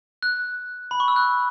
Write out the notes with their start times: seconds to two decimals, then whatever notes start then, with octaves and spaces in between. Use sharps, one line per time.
0.23 F#6
0.91 B5
1.00 C#6
1.08 E6
1.16 F#6